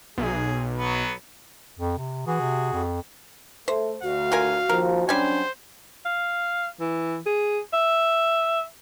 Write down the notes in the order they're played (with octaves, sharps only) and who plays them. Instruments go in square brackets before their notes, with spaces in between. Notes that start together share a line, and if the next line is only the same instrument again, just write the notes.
[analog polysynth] B1 [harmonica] G#4
[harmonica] F#3 B3
[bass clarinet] F2
C3
[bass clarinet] E3 [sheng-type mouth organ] F#4 G#4
[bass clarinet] C3
F2
[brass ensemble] A3 [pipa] C5
[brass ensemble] D2 [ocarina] F#4 [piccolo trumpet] F5
[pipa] F4 A#4 G#5
[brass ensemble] D#2 F3 [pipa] A#4
[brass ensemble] F#3 C#4 D4 [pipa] G3 G#5 [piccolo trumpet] C5
[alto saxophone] F5
E3
G#4
E5